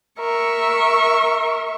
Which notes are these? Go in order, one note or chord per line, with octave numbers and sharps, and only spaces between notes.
A#4 E5 C#6